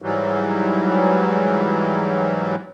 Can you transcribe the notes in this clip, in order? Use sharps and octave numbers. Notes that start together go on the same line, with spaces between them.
G#2 E3 F#3 G3